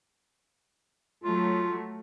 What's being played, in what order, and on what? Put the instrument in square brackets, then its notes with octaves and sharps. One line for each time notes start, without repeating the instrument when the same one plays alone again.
[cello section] F#3 A3 [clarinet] F4